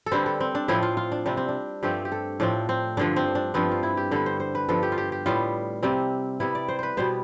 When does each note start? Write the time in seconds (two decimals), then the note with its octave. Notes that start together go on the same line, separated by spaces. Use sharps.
0.06 A4
0.12 D3 G3 C4 B4
0.26 A4
0.40 C4
0.55 D4
0.68 A2 F3 C4 E4
0.83 F4
0.97 F4
1.12 D4
1.26 C3 G3 C4 D4
1.37 C4
1.49 D4
1.83 G2 F3 A3 C4 G4
2.05 G4
2.12 A4
2.40 A2 F3 C4 D4
2.69 C4
2.97 G2 D3 F3 D4
3.16 C4
3.35 D4
3.54 G2 F3 B3 C4
3.71 F4
3.83 E4
3.97 G4
4.11 D3 G3 B3 A4
4.26 C5
4.40 C5
4.55 B4
4.69 G2 F3 B3 A4
4.83 G4
4.92 F4
4.98 G4
5.12 G4
5.26 A2 G3 B3 F4
5.83 C3 G3 C4
6.40 C3 G3 B3 E4
6.55 D5
6.68 C5
6.79 B4 C5
6.97 B2 G3 B3 C5